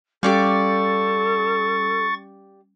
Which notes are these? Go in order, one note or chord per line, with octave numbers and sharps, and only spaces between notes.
G3 C#4 G4 A4 D5 F5 C#6 A6